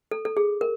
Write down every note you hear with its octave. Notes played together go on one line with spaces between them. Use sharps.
A4
A4
G#4
A#4